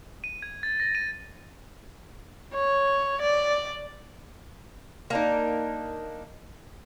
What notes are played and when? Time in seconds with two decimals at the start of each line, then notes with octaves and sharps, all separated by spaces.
0.24 D#7
0.42 G#6
0.63 A6
0.80 A#6
0.95 D#7
2.53 C#5
3.21 D5
5.10 A#3 D4 D#4